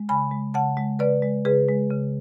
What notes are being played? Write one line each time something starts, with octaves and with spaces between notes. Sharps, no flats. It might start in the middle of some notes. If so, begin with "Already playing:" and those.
Already playing: G#3
C#3 G#5 B5
G#3
C#3 F#5 A5
G#3
C#3 B4 D5
G#3
C#3 G#4 B4
G#3
C#3